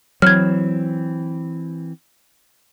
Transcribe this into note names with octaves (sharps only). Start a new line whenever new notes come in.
E3 F#3 C4 F6 G#6